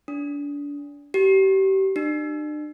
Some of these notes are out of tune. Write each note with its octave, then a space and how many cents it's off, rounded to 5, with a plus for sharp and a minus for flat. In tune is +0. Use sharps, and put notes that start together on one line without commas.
D4 -30
G4 -30
D4 +40